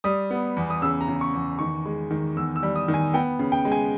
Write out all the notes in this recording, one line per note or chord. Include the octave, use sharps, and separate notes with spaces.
G3 D#6
B3
E2
D#6
C#3 E6
A#5
C#3
C#6
E2
D#3 C#6
G#3
D#3
E2 E6
E6
G3
D#6
D#3
G#5
B3 G5
C#3
G5
G#3
G#5